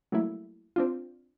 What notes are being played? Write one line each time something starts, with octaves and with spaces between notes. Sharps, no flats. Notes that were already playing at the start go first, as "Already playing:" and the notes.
F#3 G3 A3 A#3 E4
C4 D4 F4